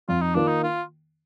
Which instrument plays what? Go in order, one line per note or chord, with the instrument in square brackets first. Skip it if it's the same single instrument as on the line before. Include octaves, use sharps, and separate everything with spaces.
[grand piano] F2 [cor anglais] F4
[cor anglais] D#4
[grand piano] D#3 A#3 F4 [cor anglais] D4
[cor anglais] D#4
F4